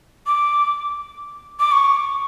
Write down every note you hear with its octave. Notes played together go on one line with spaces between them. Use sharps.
D6
D6
C#6